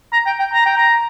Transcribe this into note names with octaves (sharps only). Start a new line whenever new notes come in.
A#5
G5
G5
A#5
G5
A#5